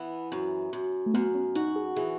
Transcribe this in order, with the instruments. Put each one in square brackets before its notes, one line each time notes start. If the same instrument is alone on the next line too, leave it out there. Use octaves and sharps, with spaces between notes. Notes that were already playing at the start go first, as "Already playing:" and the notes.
Already playing: [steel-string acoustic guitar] E3 B3
F#2
F#2
[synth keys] A3
[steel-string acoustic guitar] F#2 [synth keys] B3
[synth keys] C#4
[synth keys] D#4 [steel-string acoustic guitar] F#4
[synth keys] G#4
[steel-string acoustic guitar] E3 [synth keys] G#4